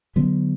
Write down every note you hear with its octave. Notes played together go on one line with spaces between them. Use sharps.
D3 F#3 B3